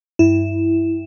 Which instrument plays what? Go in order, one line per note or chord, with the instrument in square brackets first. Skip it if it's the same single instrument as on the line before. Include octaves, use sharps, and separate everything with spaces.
[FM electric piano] G2 E4